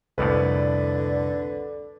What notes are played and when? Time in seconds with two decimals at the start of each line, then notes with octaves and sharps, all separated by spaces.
0.18 C2 F2 A2 D3 B4 D5